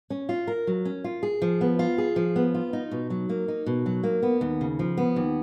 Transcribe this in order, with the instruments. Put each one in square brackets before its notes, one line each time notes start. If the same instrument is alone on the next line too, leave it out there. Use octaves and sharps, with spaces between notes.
[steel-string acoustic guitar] C#4
F4
A#4
F#3
C#4
F4
G#4
F3
B3
F4
G#4
F3
B3
F4
D#4
B2
F#3
A#3
D#4
B2
F#3
A#3
B3
D#2
C#3
F3
B3
D#2